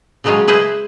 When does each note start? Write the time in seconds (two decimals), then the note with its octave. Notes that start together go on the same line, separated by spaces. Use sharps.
0.24 C#3 F3 F#3 G#3 C#4 F4
0.48 E4 G#4 B4 C5 D#5